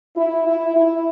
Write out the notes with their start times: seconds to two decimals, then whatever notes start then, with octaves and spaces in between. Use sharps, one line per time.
0.16 E4
0.46 E4
0.75 E4